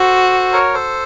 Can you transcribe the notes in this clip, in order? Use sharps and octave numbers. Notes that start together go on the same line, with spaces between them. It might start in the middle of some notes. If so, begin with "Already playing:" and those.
Already playing: F#4 A4 C5
A#4 C#5
A4 C5